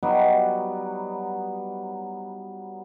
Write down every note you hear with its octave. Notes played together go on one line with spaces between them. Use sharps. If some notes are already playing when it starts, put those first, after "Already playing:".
F#3 G3 B3 D#4